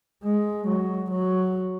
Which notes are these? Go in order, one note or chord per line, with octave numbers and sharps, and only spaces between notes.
G#3
F#3
F#3